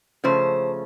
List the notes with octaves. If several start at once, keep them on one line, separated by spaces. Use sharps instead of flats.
C#3 F3 A3 C5